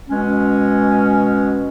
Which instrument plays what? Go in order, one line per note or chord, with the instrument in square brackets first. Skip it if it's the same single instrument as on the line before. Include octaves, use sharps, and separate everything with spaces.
[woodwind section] B2 G#3 C#4